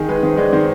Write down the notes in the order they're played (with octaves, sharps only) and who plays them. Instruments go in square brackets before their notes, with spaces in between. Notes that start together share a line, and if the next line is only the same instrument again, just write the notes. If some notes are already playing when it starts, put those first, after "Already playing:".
Already playing: [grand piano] D#3 [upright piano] G#4
[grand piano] G#3 [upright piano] B4
[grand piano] D#3 [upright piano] C5
[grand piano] G#3 [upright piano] D5
[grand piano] D#3 [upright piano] C5